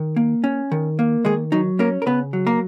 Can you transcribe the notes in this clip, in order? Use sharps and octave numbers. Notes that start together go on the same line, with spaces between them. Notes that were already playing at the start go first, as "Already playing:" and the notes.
Already playing: D#3
A#3
C#4
D#3
A#3
D#3 G#3 G#4
F#3 D#4
A#3 C#4 A#4
A#4
C#3 B3 B4
F#3
A#3 A#4